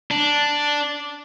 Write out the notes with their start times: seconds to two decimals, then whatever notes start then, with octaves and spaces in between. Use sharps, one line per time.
0.11 D4